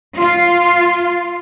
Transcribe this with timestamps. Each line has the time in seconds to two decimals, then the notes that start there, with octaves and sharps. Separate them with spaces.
0.17 F4